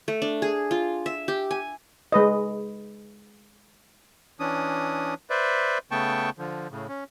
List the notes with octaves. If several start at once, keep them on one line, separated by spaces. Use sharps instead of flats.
A3
D4
G#4
F4
E5
G4
G#5
G#3 B4 D#5
E3 C#4 D4 D#6
B4 C5 D5 E5
C#3 A3 B3 G5 A5 C#6
D3 F3
A2 C#3
C#4